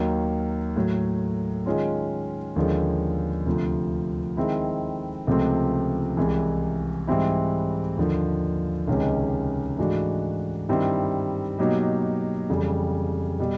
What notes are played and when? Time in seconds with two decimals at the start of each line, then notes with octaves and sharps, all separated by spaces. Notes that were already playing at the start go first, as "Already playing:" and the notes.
Already playing: D#2 D#3 F#3 A#3
0.76 A2 F#3 A3
1.66 D#3 G#3 C#4 F4
2.56 D#2 D3 F3 G#3 C#4
3.46 D2 C3 F3
4.37 D#3 G#3 C4 E4
5.27 C#2 C3 F3 A3 C4
6.17 C2 C3 E3 G#3
7.07 G#2 E3 G3 C4 E4
7.97 D#2 D3 F3
8.88 C#2 C3 D#3 G#3 C#4
9.78 G#2 E3 A3 D4 F#4
10.69 G2 D#3 G3 C4 E4
11.59 B2 F#3 A#3 D#4 G4
12.50 F2 C#3 E3 G3
13.39 B2 G3